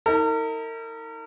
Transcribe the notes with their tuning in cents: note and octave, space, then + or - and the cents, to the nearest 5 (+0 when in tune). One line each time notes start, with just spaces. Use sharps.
D#4 +45 A#4 -40